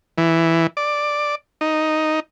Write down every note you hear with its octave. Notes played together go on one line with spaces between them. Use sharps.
E3
D5
D#4